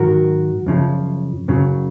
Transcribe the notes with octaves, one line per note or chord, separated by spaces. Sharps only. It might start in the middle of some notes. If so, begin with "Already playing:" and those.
Already playing: G#2 D#3 F#3 F#4 A#4
F#2 C#3 F3
F#2 C#3 F#3